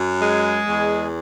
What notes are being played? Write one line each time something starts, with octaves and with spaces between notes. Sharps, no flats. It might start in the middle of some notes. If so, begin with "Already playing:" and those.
Already playing: F#2
G#3
E2